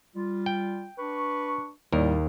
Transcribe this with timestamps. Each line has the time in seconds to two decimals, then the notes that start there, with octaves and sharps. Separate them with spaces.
0.16 G3 F4
0.46 G5
0.99 D4 B4 C#6
1.92 D#2 A2 G3 A#4